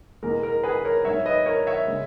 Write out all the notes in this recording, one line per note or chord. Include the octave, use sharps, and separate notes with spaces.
E2 B2 G#3 A#4
A#4
G#4 B4
A#4 C#5
G#2 F#3 C#5 E5
B4 D#5
A#4 C#5
C#5 E5
C#3 G#3